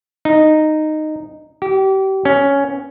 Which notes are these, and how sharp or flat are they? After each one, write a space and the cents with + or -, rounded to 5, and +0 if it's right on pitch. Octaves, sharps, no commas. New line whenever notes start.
D#4 -10
G4 -30
C#4 +5